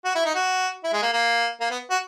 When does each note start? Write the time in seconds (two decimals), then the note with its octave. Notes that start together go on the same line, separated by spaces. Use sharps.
0.05 F#4
0.15 E4
0.25 D#4
0.35 F#4
0.84 E4
0.93 G#3
1.02 A#3
1.13 A#3
1.61 A#3
1.71 B3
1.90 F#4